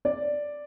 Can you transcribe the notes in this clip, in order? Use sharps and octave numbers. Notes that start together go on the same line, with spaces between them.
D5